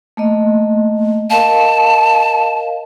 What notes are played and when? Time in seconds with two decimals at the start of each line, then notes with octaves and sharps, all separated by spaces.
0.17 A3 A#3 D#5
1.30 A#4 D#5 F5 A5